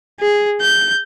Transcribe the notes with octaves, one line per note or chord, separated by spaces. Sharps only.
G#4
G6